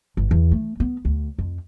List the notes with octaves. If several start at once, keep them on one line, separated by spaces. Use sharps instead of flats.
G1
E2
A3
B3
D2
F2